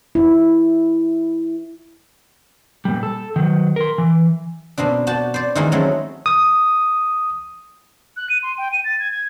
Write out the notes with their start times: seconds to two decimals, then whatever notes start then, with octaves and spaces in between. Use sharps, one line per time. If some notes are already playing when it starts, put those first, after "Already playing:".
0.15 E4
2.85 A#2 G3
3.03 A4
3.36 D#3 F#3
3.76 A#4 C6
3.98 E3
4.78 B2 A#3 C4 D4
5.07 F#4 D5 G5 A5
5.34 C5 D5
5.55 D#3 E3 G#3 A#3 C4 D#4
5.72 F#3 G#3 A3 C4 C#4 E4
6.26 D#6
8.16 F#6
8.30 D#7
8.43 C6
8.58 G5
8.72 D#7
8.84 A6
8.99 G#6
9.11 G#6